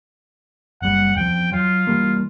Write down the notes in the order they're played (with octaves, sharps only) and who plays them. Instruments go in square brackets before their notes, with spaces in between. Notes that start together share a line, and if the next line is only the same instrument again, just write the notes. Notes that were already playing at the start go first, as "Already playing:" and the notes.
[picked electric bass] F#1 G3 [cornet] F#5
[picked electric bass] E2 F3 [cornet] G5
[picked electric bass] F#3 [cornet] F4
[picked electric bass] E3 G3 A#3